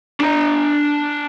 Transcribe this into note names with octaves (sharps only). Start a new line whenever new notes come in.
D4 A#5